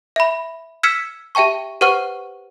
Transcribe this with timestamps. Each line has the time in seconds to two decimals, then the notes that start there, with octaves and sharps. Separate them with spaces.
0.16 E5 B5
0.83 E6 F6 G#6 B6 C#7 E7
1.35 G4 E5 G5 A5 C#6
1.81 G4 B4 C5 F#5 C#6 F6